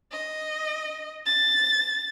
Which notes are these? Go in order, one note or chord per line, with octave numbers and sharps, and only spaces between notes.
D#5
A6